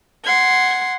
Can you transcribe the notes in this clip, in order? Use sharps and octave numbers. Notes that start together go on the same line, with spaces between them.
F#5 C6 G#6